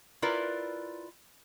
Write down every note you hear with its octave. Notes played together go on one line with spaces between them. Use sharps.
E4 F4 A#4 B4 D5